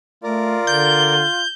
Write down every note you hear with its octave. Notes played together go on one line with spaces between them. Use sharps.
A3 F4 A#4 D5
D3 G6